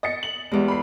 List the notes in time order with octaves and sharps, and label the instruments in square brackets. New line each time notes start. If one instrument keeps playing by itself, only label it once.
[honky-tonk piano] D#5 A6 C#7
F#7
[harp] E2 G#3 [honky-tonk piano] G3
[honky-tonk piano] B5 C7